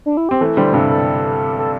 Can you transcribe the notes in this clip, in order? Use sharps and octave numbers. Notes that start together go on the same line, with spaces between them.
D4
E4
C4 G4
E3 A3 A4
D3 G3 C5
G2 C3 A4
A4
A4